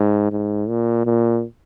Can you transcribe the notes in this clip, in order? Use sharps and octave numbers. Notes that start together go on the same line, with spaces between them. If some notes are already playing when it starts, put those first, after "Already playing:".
Already playing: G#2
G#2
A#2
A#2